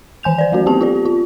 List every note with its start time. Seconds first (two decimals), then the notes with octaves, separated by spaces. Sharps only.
0.23 D#3 E3 G#5 G6 F7
0.38 C5 D5
0.52 F#3 A3 C#4 F#4
0.66 B3 C4 G4 A5
0.81 F4 G4 D5
1.05 F4